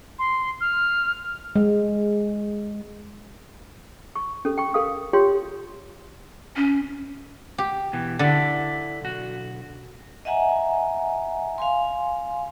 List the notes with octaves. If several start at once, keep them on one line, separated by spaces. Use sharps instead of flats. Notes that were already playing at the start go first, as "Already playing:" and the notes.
C6
F6
G#3
C#6
C#4 A4
G5 C#6
A4 A#4 F5 D#6
F4 G4 C#5 G5 C6
C#4
G4
B2 E3
D3 E4 D5
B1 F#4
D#5 E5 F#5 G#5 A#5
F5 G#5 C6